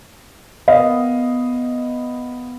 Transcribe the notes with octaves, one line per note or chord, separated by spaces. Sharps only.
B3 D#5 F5